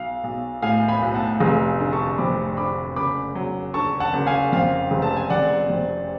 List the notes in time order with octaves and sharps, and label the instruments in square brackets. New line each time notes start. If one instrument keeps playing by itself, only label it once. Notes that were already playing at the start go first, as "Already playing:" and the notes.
Already playing: [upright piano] B1 [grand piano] F5
[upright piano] B1
[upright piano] A2 [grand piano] F5 G#5
[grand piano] G#5 B5
[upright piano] B1
[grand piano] F#5 A5
[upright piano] F1 [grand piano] F5 G#5
[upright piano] D3
[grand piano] A5 C#6
[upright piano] F2 [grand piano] B5 D6
[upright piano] D3 [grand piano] B5 D6
[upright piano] F#1 [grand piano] B5 D6
[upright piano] F#3
[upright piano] D3 [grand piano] A5 C#6
[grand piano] F#5 A5
[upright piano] F#1
[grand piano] F5 G#5
[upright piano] F2 [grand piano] F5
[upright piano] F1
[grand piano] A5
G#5
[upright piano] F1 [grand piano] D5 F#5
[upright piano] F2